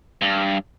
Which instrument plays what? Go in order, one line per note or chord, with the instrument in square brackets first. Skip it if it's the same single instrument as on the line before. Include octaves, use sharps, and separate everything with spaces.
[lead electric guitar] G2